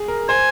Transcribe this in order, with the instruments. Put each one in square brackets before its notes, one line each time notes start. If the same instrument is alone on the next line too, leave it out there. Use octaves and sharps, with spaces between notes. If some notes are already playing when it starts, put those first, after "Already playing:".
Already playing: [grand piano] G#4
A#4
[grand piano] C5 [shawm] G#5